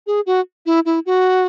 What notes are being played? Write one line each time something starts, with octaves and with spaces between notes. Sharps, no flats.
G#4
F#4
E4
E4
F#4